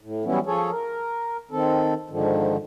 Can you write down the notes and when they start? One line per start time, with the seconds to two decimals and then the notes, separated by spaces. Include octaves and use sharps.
0.01 A2
0.25 E3 F#3 G3 B3 C#4 E4
0.46 F3 G#4 A4 C#5
0.71 A#4
1.51 D#3 C4 A4
2.10 G#2 D3 D#3 F3